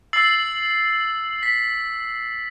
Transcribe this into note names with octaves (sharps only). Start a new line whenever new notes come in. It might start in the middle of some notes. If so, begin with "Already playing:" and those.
E6 A6 C7 F#7
B6